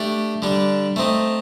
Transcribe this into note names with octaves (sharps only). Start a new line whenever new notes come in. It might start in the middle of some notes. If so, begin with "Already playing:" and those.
Already playing: A3 D4 G4 D5
D3 G3 D4
A3 C4 D#4